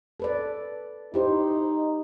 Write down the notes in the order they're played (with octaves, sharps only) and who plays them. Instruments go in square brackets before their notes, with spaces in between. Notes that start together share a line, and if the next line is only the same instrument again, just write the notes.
[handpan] A4 B4 D5
[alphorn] D#4 [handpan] E4 G4 C5